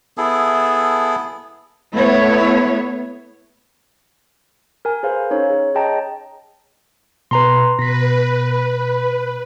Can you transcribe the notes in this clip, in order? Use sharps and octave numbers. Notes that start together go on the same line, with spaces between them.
B3 E4 G#4 A4
A3 B3 E4 B4 C#5
A#4 G#5
G#4 B4 C5 F5
C#4 D#4 C#5
G#4
G#4 C#5 D#5 G5 A5 A#5
B2 B4 A#5 C6
B2 B4 A#6 B6